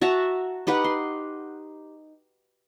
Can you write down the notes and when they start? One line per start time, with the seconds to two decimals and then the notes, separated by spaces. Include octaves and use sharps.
0.02 F#4 E5 A5 A#5
0.67 D#4 G4 B4 F#5
0.84 C6